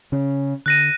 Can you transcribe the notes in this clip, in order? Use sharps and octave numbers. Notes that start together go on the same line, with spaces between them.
C#3 C#4
D3 F#6 A#6 D#7